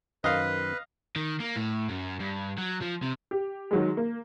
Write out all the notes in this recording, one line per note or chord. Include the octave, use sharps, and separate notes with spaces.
F#2 D#3 B4 C5 D#5 F5
D#3
A#3
A2
F#2
G2
F#3
F3
C3
G4
D#3 F#3 G#3
A#3